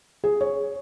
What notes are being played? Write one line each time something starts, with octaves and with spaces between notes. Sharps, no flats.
G#4
C#5